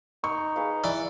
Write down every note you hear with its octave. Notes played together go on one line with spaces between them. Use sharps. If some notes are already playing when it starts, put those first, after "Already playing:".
D#4 C#6
G#4 B4 F5
E3 D5